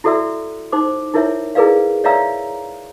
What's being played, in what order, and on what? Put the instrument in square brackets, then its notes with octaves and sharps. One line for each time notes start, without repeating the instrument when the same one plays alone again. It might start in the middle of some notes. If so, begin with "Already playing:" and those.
[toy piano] E4 F#4 A4 D5 E5 E6
D#4 C5 D6
D#4 E4 A#4 C#5 E5
E4 G#4 A#4 B4 D5 F5
C#5 D5 E5 F5 A#5 E6